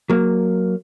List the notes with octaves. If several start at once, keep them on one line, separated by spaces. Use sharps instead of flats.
F#3 A#3